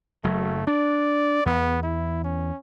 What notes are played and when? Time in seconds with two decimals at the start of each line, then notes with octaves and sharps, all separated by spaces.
0.24 F#1 F#3 A3
0.67 D4 D5
1.46 E2 B3
1.83 E4
2.24 C#4